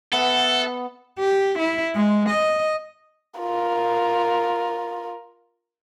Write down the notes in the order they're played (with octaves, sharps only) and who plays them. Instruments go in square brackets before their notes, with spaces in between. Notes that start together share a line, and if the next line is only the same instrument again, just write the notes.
[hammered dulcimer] B3 [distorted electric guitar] A4 [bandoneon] E5 F#5
[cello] G4
E4
G#3
D#5
[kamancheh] F4 A#4